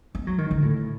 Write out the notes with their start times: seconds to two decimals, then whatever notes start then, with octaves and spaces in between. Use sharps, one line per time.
0.15 B3
0.27 F#3
0.38 D#3
0.51 D3
0.62 A2